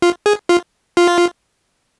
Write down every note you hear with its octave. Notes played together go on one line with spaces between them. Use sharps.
F4
G#4
F4
F4